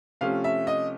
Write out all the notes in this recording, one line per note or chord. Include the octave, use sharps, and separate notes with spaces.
C3 F3 A3 C#4 F5
E5
D#5